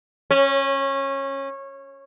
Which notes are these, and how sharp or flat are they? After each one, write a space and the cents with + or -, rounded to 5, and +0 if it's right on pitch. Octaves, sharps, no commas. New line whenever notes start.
C#4 -20